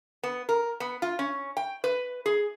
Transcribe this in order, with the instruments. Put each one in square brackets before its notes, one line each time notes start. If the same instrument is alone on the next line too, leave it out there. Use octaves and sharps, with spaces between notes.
[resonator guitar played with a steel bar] B3
A#4
B3
F4
C#4
G5
B4
G#4